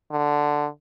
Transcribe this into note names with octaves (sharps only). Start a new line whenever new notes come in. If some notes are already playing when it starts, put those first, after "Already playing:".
D3